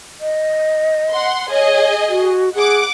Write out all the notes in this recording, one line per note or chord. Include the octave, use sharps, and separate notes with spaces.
D#5
F#5 C6
G#4 C#5 D#5
F#4
G#4 F#5 D6